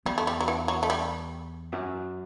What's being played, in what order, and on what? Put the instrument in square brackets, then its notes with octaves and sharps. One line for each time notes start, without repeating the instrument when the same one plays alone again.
[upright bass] E2 [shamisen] G3
[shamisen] A3
G3
F#3
E3
F#3
A3
G3
[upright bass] F#2